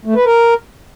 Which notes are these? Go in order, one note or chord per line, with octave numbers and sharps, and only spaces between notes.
A3
B4
A#4